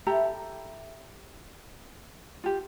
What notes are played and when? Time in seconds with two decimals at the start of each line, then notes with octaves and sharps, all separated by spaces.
0.07 E4 G4 A4 A#5
2.44 F4 G4